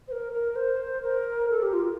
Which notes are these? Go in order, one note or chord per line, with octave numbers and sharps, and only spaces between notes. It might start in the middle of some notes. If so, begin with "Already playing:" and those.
C5
A#4
A#4
C5
A#4
A4
G4
F4